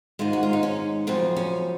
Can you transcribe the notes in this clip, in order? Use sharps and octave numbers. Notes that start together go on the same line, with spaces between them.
G#2 D#3 G#3 F4
F#4
F4
D#4
C#4
F#2 C#3 F3 C4
C#4